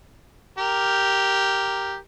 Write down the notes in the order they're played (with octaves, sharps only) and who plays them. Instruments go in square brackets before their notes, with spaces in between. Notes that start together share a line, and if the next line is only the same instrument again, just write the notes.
[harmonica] G4 A#4